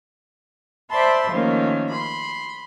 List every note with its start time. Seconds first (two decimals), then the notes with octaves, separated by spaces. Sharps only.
0.91 C5 D5 E5 A5 B5 C6
1.30 D#3 F3 A3 A#3 C#4
1.89 B5 C6